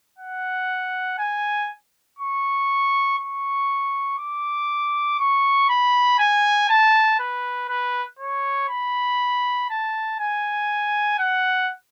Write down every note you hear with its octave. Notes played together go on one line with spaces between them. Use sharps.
F#5
G#5
C#6
C#6
D6
C#6
B5
G#5
A5
B4
B4
C#5
B5
A5
G#5
F#5